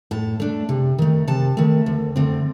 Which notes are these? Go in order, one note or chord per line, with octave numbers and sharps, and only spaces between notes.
A2 A5
A3 D4
C3
D#3 A3
C3 A5
D#3 A3
D2
D3 A3 C4